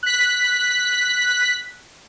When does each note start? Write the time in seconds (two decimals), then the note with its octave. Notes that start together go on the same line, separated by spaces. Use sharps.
0.03 F#6 B6